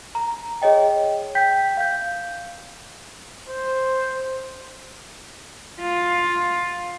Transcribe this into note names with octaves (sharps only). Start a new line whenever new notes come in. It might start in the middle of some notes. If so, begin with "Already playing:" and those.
A#5
G#4 C#5 D#5 G5
G5 G6 B6
F5 G6
C5
F4